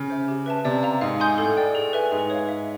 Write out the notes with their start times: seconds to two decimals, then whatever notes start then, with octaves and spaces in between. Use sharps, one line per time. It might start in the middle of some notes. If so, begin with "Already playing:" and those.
Already playing: C#3
0.10 C5 E5
0.28 G4
0.46 B4 E5 A5
0.65 C3 D5
0.83 F5 A#5
1.01 G#2 F5
1.20 G#5 C6 D#6 G6
1.38 A2 A4
1.57 D5 G5
1.75 G#4
1.93 B4 E5 G#5
2.12 G#2 G#4
2.30 C#5 F5
2.49 E5